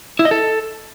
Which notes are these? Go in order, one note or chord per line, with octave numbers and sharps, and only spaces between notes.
E4
D#5
A4